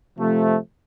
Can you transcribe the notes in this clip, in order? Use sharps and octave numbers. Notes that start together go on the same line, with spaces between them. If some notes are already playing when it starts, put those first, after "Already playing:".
C3 F3 A3